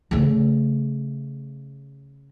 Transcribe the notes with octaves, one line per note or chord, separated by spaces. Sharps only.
C#3 A3